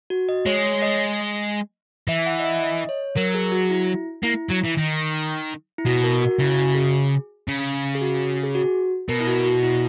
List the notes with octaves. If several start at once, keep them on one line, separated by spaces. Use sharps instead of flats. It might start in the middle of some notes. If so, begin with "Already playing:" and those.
F#4
D#5
G#3 C#5
C#5
D#5
E3 E5
F#5
D#5
E5
D#5
C#5
F#3 A#4
G#4
F#4
E4
A#3 E4
F#3
E3
D#3
E4
B2 F#4
A#4
F#4
C#3 E4
F#4
G#4
C#3
G#4
F#4
G#4
F#4
B2 A#4
E4
F#4
F#4
E4